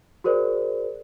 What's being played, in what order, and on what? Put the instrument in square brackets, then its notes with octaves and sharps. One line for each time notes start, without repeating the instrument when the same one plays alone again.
[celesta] F#4 G#4 A#4 C5 D5